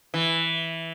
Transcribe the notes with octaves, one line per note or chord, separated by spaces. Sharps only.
E3